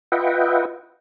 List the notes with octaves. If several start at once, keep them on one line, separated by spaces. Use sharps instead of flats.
F4 B4 D#5 E5 F#5 G5